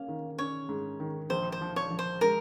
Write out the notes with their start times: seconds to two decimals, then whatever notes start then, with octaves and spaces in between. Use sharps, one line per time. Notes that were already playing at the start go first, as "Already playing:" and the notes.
Already playing: A#3 C#4 F5
0.08 D#3
0.39 C#4 C#5
0.69 G#2
1.00 D#3
1.30 A#1 C5
1.52 C5
1.61 F3
1.76 C#5
1.90 F3
1.99 C5
2.21 G#3 A#4